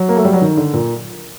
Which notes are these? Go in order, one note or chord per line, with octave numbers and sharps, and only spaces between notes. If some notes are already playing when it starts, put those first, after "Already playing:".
Already playing: F#3
A#3
A3
G3
F#3
D#3
D3
A#2